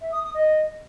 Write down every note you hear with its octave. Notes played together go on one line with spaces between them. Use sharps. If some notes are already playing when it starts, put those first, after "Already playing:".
E5
D#6
D#6
D#5